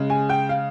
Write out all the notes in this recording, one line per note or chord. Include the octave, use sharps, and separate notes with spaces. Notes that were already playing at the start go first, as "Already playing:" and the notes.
Already playing: C#3 G#3
G#5
G5
F5